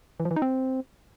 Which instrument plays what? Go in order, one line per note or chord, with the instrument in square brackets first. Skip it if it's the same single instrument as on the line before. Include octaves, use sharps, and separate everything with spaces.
[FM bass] E3
F3
E3
D#4
C4